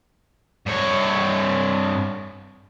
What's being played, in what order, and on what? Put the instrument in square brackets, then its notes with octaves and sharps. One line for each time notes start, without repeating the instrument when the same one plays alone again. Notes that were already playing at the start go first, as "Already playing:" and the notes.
[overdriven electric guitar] G2 C#5